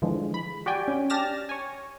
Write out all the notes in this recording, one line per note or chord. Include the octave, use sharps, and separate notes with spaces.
D3 E3 F3 G#3
B5
F#4 G4 D5 G5 G#5
C#4
D4 G4 F6 A6 A#6 E7
C#5 G#5